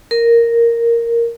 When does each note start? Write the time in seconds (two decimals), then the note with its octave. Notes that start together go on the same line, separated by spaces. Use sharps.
0.11 A#4